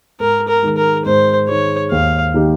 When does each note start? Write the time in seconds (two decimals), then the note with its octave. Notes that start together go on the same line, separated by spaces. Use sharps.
0.20 G#2 A#4
0.48 A#4
0.62 D#3 G#3
0.77 A#4
1.05 G#2 C5
1.48 D#3 G#3 C#5
1.91 D#2 F5
2.34 D#3 A#3 D#4 G4